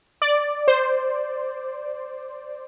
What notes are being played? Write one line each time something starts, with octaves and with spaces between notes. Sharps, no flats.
D5
C5